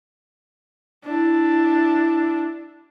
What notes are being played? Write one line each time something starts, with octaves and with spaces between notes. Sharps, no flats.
D4 E4